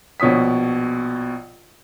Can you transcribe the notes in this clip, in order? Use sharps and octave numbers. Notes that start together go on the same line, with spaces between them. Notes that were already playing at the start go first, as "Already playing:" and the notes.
A#1 B2 C#5 D#6 B6